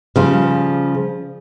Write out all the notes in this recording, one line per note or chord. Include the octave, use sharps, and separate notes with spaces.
C#3 F3 G3